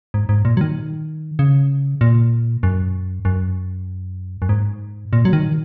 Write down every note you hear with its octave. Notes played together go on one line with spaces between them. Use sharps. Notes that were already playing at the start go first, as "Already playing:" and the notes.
G#2
G#2
A#2
F#3
D#3
C#3
A#2
F#2
F#2
F#2
G#2
A#2
F#3
D#3